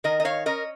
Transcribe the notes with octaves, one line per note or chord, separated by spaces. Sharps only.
D#3 A#4 D#5
D#5
C#5 F5
C#4 A#4 D#5